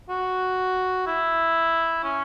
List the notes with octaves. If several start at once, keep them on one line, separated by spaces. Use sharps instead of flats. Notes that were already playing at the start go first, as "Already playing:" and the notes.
F#4
E4
C#4